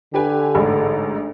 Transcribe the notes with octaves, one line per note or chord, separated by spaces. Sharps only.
D3 G4 B4 G#5
A1 G#2